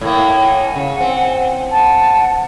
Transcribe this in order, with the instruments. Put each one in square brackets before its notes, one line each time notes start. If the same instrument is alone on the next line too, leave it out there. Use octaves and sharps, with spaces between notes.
[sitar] A2 A#3 [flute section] E4 G#6
[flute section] F#5 G#5
[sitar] C#3
C4
[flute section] F#5 A5